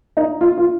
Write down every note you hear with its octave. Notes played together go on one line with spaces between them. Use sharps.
D#4
F4
F4